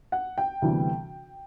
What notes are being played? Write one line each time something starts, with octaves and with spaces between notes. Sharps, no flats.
F#5
G5
D2 C3 E3 G3 B3